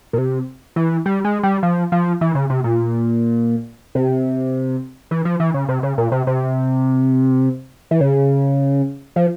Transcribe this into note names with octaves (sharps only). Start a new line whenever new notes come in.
A#2
C3
E3
G3
G#3
G3
F3
F3
E3
C#3
C3
A#2
C3
E3
F3
E3
C#3
C3
C#3
A#2
C3
C3
E3
C#3
F3